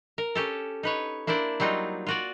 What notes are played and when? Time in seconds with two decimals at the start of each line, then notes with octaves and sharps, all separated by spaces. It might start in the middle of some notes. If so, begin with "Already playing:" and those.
0.18 A#4
0.35 C#4 G4 A4
0.83 D#4 B4 C#5
1.27 A#3 D4 E4 C5 D5
1.60 F#3 G3 C4 D#4 F4
2.07 F4 F#4 D5